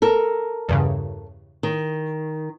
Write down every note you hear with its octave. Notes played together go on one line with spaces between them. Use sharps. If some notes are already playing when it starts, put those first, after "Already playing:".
A4 A#4
E2 G2 C#3
D#3